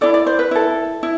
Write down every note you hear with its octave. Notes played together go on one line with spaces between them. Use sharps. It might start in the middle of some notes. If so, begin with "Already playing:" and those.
E4 A4 D5
D5
C5
B4
E4 A4
E4